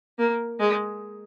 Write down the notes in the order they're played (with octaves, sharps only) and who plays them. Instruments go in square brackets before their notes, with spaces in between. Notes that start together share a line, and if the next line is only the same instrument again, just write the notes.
[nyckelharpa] A#3
G#3